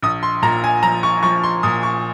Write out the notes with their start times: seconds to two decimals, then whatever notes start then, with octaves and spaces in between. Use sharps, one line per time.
0.02 A#1 D#6
0.23 C6
0.42 A#2 A#5
0.64 G#5
0.83 F3 A#5
1.03 C#6
1.23 F3 C#6
1.43 C6
1.63 A#2 D#6
1.83 C#6